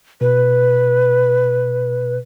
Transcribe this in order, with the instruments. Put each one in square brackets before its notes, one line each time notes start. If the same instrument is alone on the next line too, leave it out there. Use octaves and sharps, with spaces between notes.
[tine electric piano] B2 [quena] B4